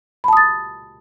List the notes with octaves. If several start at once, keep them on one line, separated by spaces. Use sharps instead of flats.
A5 B5 D#6 A6